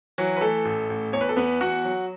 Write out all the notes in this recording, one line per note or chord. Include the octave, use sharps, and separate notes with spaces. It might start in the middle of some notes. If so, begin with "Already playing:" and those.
E3 F#3 F#4
B4
E3 A3 A4
A1
A1
E2 C#5
B4
A4
E2 B3 B4
E2 F#4 F#5
F#3